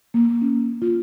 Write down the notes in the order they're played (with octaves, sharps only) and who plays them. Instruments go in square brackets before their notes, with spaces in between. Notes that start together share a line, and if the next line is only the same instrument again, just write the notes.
[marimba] A#3
C#4
F4